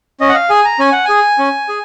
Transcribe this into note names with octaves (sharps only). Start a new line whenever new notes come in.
C#4 D#5
F#5
F5
G#4 G#5
A#5
C#4 G#5
F#5
G#4 G#5
C#4
G#4